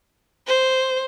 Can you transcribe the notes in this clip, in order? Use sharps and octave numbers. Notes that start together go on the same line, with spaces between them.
C5